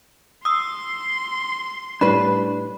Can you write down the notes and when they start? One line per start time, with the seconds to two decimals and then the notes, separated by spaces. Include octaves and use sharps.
0.45 C6 D#6 E6
2.01 A2 G3 D4 B4 C#5 B5